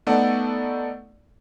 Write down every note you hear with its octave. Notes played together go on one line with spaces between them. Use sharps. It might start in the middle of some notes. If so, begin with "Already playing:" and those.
A3 B3 D#4 A4 D5 F#5